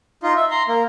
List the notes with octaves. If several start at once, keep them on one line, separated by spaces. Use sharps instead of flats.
D#4 F4
E5
A#5 C6
A#3